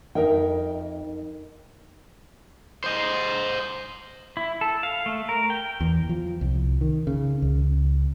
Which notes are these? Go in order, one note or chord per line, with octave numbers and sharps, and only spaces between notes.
F2 G#2 D#4 A#4 E5 G5
C5 D#5
E4
A4
F5
A3
A#4
G5
E2
F3
C2
D#3
C#3
C#2